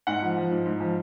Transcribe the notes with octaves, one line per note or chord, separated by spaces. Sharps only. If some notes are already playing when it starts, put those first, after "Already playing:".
G#2 F#5
F3
F3
G#2
G#2
F3